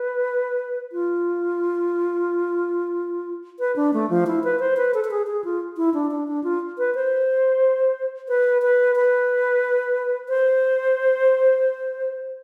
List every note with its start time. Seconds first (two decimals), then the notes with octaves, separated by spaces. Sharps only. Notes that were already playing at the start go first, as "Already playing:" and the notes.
Already playing: B4
0.92 F4
3.59 B4
3.76 D4
3.94 A3
4.10 F3
4.27 E4
4.44 B4
4.60 C5
4.77 B4
4.94 A4
5.05 A4
5.11 G#4
5.27 G#4
5.44 F4
5.77 E4
5.94 D4
6.11 D4
6.28 D4
6.44 F4
6.78 B4
6.95 C5
8.29 B4
8.62 B4
8.96 B4
10.29 C5